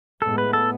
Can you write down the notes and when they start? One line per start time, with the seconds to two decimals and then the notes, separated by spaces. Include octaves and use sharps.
0.22 A2 G#3 B3 A4
0.38 B4
0.53 A4